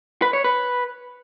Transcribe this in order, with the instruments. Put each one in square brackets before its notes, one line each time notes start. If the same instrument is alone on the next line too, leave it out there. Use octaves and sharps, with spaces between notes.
[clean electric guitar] B4
C#5
B4